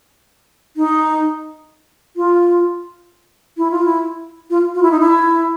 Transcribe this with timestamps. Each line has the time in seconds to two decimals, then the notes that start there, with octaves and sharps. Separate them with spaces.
0.77 D#4
2.16 F4
3.57 E4
3.71 F4
3.85 E4
4.50 F4
4.75 F4
4.83 E4
4.91 D#4
5.00 E4